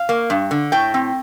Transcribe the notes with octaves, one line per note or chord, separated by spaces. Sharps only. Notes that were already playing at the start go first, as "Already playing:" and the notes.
Already playing: F5
A#3
G2
D3
A2 G5
C4